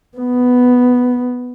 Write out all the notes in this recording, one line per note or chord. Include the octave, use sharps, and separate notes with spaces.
B3